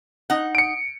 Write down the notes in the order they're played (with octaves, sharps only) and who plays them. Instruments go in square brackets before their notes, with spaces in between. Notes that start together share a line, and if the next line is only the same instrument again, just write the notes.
[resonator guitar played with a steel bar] D#4 F#5
[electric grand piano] C#7 D7